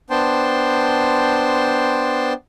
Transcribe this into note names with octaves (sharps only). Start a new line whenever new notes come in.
B3 D4 C5 G5 A5 C6